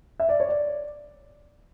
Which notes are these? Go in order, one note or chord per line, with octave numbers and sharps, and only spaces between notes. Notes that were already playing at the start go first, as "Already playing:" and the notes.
E5
D5
C#5
D5